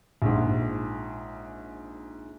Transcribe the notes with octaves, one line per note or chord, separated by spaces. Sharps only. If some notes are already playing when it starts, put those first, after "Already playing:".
A#1 G#2